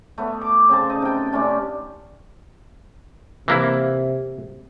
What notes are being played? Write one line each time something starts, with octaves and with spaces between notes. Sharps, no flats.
A3 B3 C#5
D6
C#3 C4 A5
D#4 D#5
C3 G5
C3 A3 C#4 D4
C3 E3 A#3 E4